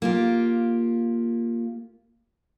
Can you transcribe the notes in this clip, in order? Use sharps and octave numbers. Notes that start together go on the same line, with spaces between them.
A#3 F4 G4